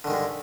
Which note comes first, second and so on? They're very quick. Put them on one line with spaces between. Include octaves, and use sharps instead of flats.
D3 D#3 G#3 G2